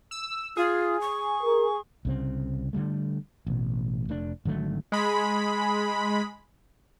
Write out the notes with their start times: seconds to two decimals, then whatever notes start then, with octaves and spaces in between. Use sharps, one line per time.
0.11 E6
0.57 F4 G#4
1.01 C#6
1.43 A#4
2.05 C2 C#3 C4
2.73 D3 E3 G3 A3
3.47 A1 B2
4.09 F1 A3 D4
4.45 G#1 D3 F#3 A3
4.92 G#3 B5